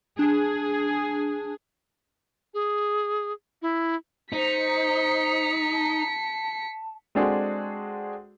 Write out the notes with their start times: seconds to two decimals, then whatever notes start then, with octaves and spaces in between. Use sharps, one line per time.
0.19 D4 G#4
2.54 G#4
3.62 E4
4.33 D#4 C5 B6 C#7
5.72 A5
7.15 G#3 C4 D4 F#4 G#4 A4